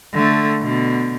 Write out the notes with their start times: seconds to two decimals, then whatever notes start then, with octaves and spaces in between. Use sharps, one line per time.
0.14 D3 A3
0.62 B2 D3